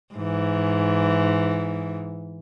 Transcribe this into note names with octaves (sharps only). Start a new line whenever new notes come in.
G#2 E3